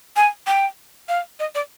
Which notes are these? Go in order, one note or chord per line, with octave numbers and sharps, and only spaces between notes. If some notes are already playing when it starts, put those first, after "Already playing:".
G#5
G5
F5
D#5
D5